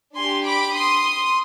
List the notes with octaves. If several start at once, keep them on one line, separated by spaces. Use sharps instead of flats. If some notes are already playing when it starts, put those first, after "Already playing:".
D4 G4 G#5 C6
B5 D6
C6 D#6